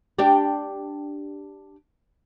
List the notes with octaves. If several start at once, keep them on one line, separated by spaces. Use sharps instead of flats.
D4 G4